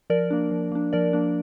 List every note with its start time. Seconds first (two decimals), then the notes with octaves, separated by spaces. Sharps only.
0.10 F3 A#4 D5
0.30 A#3 D4
0.51 F3
0.72 A#3 D4
0.93 F3 A#4 D5
1.13 A#3 D4